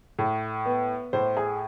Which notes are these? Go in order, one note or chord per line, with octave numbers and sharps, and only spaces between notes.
A2
B3
A2 C5
G#4